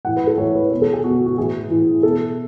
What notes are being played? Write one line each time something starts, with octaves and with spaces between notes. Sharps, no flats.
A2 E3 F#5
B4
A4
A2 E3 C#5
B4
B2 B4
A4
G#4
B2 F#4
F#4
A2 E3 G#4
A2 E3
B2 A4